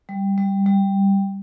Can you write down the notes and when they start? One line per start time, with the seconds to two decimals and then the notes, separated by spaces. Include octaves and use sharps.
0.09 G3
0.38 G3
0.66 G3